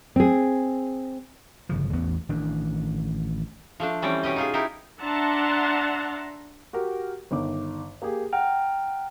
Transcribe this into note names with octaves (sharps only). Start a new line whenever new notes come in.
C4 G#4
G1 C#3 F3
A1 E2 B3
A1 D#3 D4
F3 A3 D4
E3 G3 C4 C#4 D5
B2 C#4 G4 D#5
D#4 F4 G#4
D#4 E4 G4 A#4
D4 E5 F#5 A5 A#5 C6
F#4 G4 A#4
G1 D#3 D6
A#3 G4 G#4
F#5 G5 A#5 F6